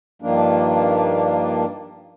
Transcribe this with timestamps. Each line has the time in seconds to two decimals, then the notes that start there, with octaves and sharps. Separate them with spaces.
0.22 G2 D#3 F3 A#3 D4